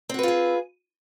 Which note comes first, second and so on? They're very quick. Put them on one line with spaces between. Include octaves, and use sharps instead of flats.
C4 F#4 B4 F4 G#4